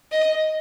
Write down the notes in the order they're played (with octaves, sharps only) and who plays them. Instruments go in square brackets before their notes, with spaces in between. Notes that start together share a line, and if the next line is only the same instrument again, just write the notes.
[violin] D#5